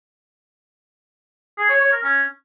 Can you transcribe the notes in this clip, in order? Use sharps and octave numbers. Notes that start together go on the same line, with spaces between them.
G#4
C#5
C#5
A#4
C#4